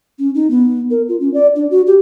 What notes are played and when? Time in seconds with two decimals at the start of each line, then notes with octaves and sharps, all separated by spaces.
0.19 C#4
0.35 D#4
0.51 B3
0.91 A#4
1.09 F4
1.20 C#4
1.34 D5
1.56 D4
1.71 F#4
1.87 G4